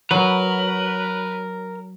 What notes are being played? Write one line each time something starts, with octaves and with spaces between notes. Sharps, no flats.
F#3 A#4 B4